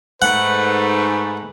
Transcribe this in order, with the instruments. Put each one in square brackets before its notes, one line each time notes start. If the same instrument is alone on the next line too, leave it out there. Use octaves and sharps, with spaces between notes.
[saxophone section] G#2 A3 [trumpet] B4 [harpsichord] F#5